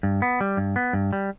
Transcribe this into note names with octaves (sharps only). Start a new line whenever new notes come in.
G2
B3
G3
G2
B3
G2
G3